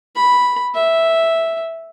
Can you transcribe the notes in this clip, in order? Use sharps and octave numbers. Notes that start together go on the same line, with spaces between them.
B5
E5